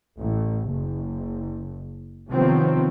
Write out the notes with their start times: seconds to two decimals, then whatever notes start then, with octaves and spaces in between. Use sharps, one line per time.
0.16 A1
0.70 F#1
2.31 C3 D#3 F3 F#3 B3 C4